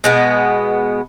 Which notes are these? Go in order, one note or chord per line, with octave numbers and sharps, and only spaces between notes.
B2 G#3 B3